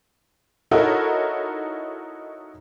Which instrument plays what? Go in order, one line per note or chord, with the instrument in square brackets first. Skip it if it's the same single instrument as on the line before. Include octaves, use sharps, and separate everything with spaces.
[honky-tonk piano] D#4 E4 F#4 A4 A#4 C#5